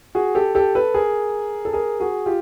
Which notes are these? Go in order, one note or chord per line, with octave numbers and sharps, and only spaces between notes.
F#4 G#4
G4 A4
G4 A4
A4 B4
G#4 A#4
A4
G#4 A#4
F#4 G#4
F4 G4